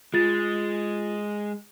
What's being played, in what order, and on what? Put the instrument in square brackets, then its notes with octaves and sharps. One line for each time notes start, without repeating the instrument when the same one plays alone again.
[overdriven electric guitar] G#3 [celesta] F4 A6